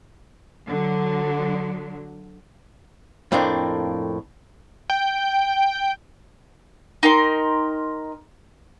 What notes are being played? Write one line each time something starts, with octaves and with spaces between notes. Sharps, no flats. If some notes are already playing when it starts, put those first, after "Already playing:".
D3 F#3
F2 A2 A#3 C4 D4
G5
D#4 A#4 G5 C6